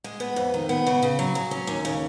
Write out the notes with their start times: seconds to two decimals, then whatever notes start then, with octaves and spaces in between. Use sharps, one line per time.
0.04 G#3
0.20 B3
0.36 F2
0.54 D#3
0.69 B3
0.87 C#3
1.03 C#3
1.19 F#3
1.35 F#3
1.51 C#4
1.67 D#2
1.85 C#3